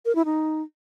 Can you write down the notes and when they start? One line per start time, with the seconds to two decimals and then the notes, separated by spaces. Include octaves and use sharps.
0.05 A#4
0.15 E4
0.25 D#4